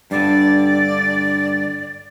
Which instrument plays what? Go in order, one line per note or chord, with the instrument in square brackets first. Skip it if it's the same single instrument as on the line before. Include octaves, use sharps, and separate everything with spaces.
[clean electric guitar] G2 D3 [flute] D5